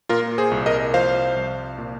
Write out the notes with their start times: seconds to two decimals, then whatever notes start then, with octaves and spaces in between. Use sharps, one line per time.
0.09 A#2 F4 A#4
0.38 G#4 C5
0.51 C2
0.66 A#4 D#5
0.94 F3 C5 F5
1.36 C2
1.78 A#2